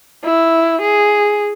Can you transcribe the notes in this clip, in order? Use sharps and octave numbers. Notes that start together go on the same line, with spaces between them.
E4
G#4